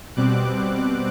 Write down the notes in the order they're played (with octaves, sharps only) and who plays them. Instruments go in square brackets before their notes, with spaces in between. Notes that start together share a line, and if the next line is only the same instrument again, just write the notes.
[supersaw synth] B2 G3 C4 D6 F#6